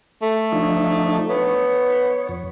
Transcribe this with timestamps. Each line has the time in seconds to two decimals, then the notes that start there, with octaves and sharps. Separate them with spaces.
0.22 A3
0.52 F3 D4 D#4
1.30 B3 C#5
2.29 F2